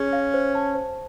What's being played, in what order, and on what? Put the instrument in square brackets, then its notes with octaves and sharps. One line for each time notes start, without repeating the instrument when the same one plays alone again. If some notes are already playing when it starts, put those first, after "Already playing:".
Already playing: [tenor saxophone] C#4 [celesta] G#4
[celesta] F5
C5
A5
C5